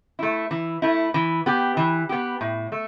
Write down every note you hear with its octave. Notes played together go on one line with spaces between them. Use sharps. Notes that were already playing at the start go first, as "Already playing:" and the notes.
A3 E4
E3
A3 E4
E3
B3 G4
E3
B3 G4
A2
A3